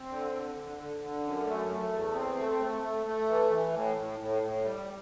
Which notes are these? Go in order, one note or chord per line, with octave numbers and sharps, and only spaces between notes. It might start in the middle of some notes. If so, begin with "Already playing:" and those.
Already playing: C4
D3
D3
D3
D3
D3
F#2
A3
A3
E2
C4
A3
A3
A3
A3
E3
E3
A2
A2
A2
A2
G3